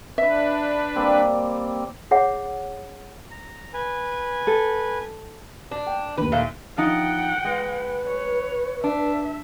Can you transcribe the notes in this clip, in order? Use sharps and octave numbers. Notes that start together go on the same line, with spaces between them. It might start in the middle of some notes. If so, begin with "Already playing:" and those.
D4 B4 E5
G3 A#3 C4
G#4 C#5 E5 F#5
A#5
B4 G#5
A4
D4
G5
D#2 D#3 B4
A#2 D3 A3
F3 D#4 F#5 G5
G#3 B4
C#5
D4 E5